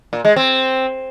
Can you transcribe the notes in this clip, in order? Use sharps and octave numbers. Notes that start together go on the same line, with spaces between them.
A#2
G#3
C4